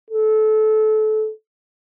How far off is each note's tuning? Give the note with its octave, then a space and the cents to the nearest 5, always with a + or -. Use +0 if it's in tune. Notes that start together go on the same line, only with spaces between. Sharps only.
A4 -25